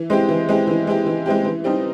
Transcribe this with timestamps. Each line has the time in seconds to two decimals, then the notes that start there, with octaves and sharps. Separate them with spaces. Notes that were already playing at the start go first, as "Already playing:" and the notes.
Already playing: E3
0.10 G#3 C4 E4 G4
0.29 E3
0.49 G#3 C4 E4 G4
0.67 E3
0.87 G#3 C4 E4 G4
1.06 E3
1.26 G#3 C4 E4 G4
1.45 E3
1.64 G3 C4 D#4